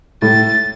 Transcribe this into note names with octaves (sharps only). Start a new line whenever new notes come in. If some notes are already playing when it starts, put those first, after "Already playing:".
A2 A6